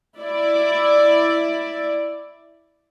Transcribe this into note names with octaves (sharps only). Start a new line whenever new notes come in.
E4 D5